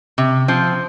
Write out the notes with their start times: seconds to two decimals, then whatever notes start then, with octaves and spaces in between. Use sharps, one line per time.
0.18 C3
0.48 F3 C4